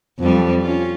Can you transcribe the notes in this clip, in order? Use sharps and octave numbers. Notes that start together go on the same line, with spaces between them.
F2 G3
C#4 F4